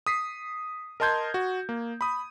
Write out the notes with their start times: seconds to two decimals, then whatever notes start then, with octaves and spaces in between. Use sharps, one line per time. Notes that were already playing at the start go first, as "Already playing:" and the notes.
0.06 D#6 B6 C7
1.00 A#4 D#5 A5 C6 G6 G#6
1.34 F#4
1.69 A#3
2.01 B5 D#6